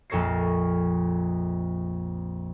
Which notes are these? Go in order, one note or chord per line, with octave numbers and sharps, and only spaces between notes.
A#1 F2 A4 C#5 A#6 C7